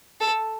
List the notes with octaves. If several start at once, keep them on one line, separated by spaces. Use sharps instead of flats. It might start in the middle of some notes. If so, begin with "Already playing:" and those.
A4